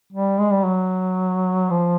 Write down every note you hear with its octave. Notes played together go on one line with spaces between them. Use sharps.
G3
G#3
G3
F#3
F3